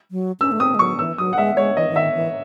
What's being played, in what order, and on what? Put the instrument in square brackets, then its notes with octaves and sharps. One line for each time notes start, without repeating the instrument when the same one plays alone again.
[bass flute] F#3
[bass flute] C#4 [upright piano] E6
[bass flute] A3
[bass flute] C4 [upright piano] D#6
[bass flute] G#3
[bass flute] F#3 [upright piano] C#6
[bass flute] E3 [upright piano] E6
[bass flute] F#3 [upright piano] D#6
[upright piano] F#5
[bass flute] G#3 [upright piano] E5
[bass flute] G#3 [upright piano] C#5
[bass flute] E3 [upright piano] D#5
[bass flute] E3
[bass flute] D#3 [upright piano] E5
[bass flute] E3